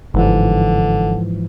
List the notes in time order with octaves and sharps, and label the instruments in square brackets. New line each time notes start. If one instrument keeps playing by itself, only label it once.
[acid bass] G1 [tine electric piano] G#2 E3 F3 [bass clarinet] D3